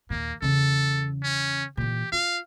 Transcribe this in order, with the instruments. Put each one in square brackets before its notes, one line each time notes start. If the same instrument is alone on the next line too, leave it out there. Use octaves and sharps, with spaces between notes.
[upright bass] D#2 A#2 [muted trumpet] A#3
[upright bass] E2 C#3 [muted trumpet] A4
[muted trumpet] C#4
[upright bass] A#2 E3 [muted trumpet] G4
[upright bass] F4 [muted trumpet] F5